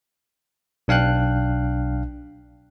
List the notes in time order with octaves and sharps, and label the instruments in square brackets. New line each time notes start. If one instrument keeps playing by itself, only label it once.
[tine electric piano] B1 D4 F5 G5 F#6